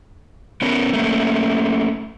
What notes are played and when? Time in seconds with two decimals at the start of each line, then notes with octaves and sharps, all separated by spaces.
0.62 B3 C#4 A#4
0.93 A3 A#3 C#4